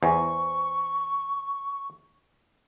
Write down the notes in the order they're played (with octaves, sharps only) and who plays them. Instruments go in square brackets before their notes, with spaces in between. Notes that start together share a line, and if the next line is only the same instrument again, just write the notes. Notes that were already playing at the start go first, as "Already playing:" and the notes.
[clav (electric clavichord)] E2 [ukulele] C5 G#5 [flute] C#6